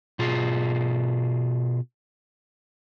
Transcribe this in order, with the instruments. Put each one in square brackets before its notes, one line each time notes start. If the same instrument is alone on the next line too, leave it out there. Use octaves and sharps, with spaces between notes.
[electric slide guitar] B2 F4 G#4